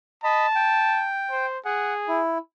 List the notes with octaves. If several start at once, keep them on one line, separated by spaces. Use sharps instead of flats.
D#5 A5 B5
G5
C5
G#4 F#5
E4